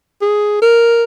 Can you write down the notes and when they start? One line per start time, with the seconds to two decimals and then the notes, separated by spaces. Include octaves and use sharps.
0.21 G#4
0.62 A#4